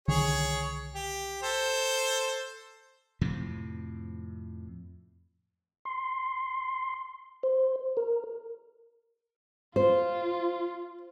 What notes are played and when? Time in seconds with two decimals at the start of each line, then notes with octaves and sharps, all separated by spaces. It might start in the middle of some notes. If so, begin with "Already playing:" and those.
0.08 C2 D3 D#3 G#4 C#5
0.95 G4
1.43 A4 C5
3.21 F2 A2 C3
5.85 C6
7.43 C5
7.97 A#4
9.76 F4 C5